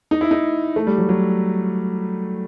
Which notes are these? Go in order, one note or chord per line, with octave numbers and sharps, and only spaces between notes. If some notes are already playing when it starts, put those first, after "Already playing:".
D#4
E4
D#4
A3
G3
F#3
F#3